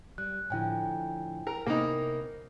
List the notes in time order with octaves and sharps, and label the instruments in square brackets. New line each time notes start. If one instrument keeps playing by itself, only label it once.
[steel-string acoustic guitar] G3 [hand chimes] F#6
[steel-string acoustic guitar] A2 D3 F3 [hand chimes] E4 G5 G#5
[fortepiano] A#4 [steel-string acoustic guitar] A#5
[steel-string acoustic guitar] C3 B3 A#4 [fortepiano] A#3 D#4